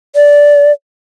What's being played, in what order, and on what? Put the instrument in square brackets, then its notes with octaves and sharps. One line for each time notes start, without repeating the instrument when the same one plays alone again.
[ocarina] D5